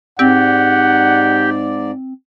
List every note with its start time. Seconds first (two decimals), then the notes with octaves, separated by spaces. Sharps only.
0.19 G#2 C4 G4 D5 F#5